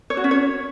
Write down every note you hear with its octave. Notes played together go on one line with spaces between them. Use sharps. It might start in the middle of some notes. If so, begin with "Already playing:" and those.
C#5
F#4
C#4
C#5